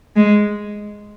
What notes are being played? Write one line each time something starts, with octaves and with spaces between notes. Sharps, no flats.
G#3